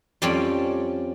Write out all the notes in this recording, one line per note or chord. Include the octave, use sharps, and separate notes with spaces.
F2 G3 C4 C#4 C#5 D5